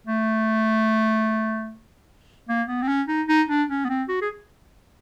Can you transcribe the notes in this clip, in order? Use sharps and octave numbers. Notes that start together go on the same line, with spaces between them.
A3
A#3
B3
C4
C#4
D#4
D#4
D4
C#4
B3
C4
F#4
G#4